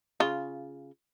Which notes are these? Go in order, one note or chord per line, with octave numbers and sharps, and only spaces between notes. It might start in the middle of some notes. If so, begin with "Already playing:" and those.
C#3 F4